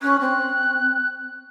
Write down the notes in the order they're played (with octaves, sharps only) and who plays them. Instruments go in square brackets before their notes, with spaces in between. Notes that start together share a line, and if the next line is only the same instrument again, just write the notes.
[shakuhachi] C#4 [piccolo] F#6
[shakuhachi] C4